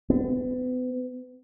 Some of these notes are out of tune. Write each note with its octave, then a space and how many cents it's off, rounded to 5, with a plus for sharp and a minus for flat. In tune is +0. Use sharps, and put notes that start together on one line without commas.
B3 +35